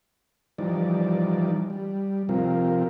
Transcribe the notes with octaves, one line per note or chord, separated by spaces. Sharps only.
E3 F3 G3 D#4 D5
G3
C3 F3 C4 F4 A#4